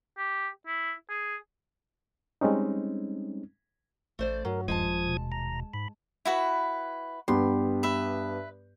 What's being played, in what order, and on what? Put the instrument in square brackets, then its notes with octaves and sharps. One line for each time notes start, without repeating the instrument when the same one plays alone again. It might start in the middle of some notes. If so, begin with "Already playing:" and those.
[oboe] G4
E4
G#4
[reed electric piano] G3 G#3 C4 C#4 D#4
[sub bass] A1 [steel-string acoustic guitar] A3 C5 D5
[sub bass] G2 [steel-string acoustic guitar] F#3 [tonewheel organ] A#4
[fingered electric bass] D#1 [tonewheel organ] F3 D#6 G#6 [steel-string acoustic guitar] G#3 G5 A5
[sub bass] B2
[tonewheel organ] A#5
[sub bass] G#2 [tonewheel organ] B5
[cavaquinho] E4 F#4 B4
[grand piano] G2 B3 G4 [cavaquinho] C6
[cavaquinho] B4 E5